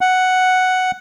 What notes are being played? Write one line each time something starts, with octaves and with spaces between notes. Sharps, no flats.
F#5